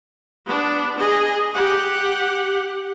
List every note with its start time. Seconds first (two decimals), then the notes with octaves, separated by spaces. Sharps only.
0.46 B3 D4
0.98 G#4 D#5
1.54 G4 F#5